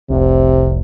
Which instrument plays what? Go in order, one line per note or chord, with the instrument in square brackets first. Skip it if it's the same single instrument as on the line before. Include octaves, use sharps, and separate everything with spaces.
[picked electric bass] F1 C2 [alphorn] C3